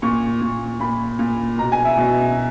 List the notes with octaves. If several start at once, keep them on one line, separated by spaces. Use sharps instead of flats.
A#2 C#6
A#2
A#2 B5
A#2
B2 A#5
G#5
E5
B2